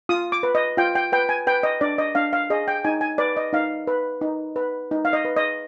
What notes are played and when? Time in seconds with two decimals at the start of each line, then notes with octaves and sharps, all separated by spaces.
0.09 F4 D#6
0.32 D6
0.43 B4
0.55 D#5
0.77 F4 G5
0.95 G5
1.12 B4 G5
1.29 G#5
1.47 B4 G5
1.63 D#5
1.81 D4 D5
1.98 D#5
2.15 D4 F5
2.33 F5
2.50 G#4 D#5
2.68 G5
2.84 D#4 G#5
3.01 G#5
3.18 B4 D5
3.37 D#5
3.53 D#4 F5
3.87 B4
4.21 D#4
4.56 B4
4.91 D#4
5.05 F5
5.13 D#5
5.25 B4
5.37 D#5